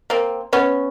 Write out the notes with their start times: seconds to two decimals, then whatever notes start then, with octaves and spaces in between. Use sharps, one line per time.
0.10 A#3 C4
0.53 B3 C#4